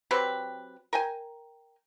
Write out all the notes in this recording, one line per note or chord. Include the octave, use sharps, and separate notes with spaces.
F#3 C4 G4 B4
A#4 G5 G#5